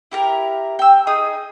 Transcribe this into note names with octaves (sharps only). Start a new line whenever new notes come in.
E4 G4 A#4
G5 E6
D#4 G#4 D#6